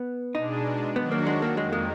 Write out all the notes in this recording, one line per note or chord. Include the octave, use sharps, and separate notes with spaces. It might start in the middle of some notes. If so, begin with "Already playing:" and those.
Already playing: B3
B2 G#3 D4 D#4
D#3 F#3 B3 D4 F#4
A#3
G#3
A#3
F2 D#3 G#3 A#3
G#3